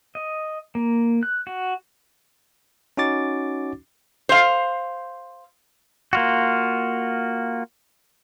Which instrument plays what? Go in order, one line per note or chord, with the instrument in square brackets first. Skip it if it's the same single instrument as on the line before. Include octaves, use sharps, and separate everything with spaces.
[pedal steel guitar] D#5
A#3
F#6
F#4
[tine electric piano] C#4 D#4 F#4 D6 A6
[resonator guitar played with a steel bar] C5 F5
[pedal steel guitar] A#3 F4 F#4